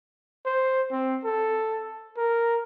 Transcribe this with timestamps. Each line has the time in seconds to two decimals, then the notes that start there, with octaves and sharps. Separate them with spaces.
0.45 C5
0.91 C4
1.24 A4
2.17 A#4